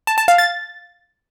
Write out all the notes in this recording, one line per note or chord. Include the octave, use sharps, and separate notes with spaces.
A5
A5
F5
A6